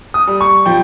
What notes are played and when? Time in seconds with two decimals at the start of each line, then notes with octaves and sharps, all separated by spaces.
0.14 D#6
0.27 G3
0.41 C#6
0.66 F3 G5